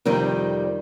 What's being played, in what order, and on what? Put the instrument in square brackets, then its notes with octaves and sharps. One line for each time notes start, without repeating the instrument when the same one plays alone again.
[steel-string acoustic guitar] F2 C3 D#3 G3